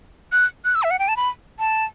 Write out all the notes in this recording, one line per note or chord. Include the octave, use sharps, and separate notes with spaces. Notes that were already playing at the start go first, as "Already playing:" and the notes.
F#6
F#6
E6
E5
F#5
G5
A5
B5
A5